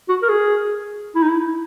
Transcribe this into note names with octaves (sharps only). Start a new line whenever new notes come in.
F#4
A#4
G#4
E4
D#4
E4